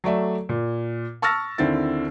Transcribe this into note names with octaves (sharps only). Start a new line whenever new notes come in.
F#3 A3 D5 E5
A#2
A5 C#6 E6 F6 A6 A#6
D#2 D3 C4 E4 A6